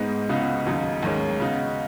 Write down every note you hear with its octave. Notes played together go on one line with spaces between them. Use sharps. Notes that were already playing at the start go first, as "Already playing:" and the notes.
Already playing: G#2 G#3 B3 D#4
C#2 C#3 B3 D#4 F#4
D#2 C#3 F#3 D#4
D#2 D#3 G#3 C#4
C#3 B3 D#4 F#4